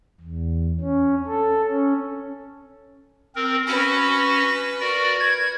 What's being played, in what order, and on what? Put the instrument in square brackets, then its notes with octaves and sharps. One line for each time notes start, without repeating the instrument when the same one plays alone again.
[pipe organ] E2
C#4
A4
C#4
C4 A#4
[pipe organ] C#4 F#4 [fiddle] B4
[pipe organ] F#4 A#4 D5
G#6